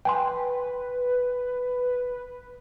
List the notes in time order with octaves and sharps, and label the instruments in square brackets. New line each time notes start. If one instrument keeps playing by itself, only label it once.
[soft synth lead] B4 [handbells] G5 G#5 C6